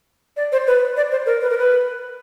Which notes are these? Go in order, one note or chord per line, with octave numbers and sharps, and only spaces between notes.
D5
C5
B4
D5
C5
A#4
B4
A#4
B4